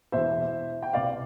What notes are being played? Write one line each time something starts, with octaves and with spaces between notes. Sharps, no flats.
E1 E2 B2 C5 E5
G5
C2 B2 B3 D5 F5